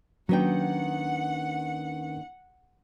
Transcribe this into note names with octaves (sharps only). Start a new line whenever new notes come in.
D#2 D#3 F#3 C#4 D4 B4 F#5 G5